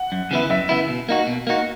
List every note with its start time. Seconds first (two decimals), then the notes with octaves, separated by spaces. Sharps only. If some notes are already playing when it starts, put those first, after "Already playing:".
Already playing: F#5
0.12 F#2
0.31 C#3 E3 B3 E4
0.50 F#2 E5
0.69 C#3 E3 B3 E4
0.88 B2
1.09 A#3 D#4 F#4
1.27 B2
1.47 A#3 D#4 F#4